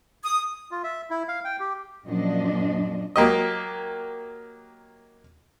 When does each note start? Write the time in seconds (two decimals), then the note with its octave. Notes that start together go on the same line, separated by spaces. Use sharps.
0.23 D#6
0.71 F4
0.83 E5
1.10 E4
1.28 F5
1.45 G5
1.60 G4
2.05 F#2 A#2 F3 D4 D#5
3.16 F#3 A#3 G4 D#5